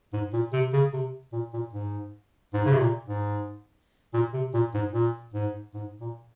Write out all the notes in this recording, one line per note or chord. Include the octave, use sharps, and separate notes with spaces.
G#2
A#2
C3
C#3
C3
A#2
A#2
G#2
G#2
C#3
C3
A#2
G#2
A#2
C3
A#2
G#2
A#2
G#2
G#2
A#2